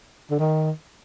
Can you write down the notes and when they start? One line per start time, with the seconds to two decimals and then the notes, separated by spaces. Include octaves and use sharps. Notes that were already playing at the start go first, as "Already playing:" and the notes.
0.31 D3
0.40 D#3